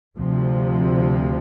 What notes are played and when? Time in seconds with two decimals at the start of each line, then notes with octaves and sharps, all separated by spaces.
0.17 D2 C3 F3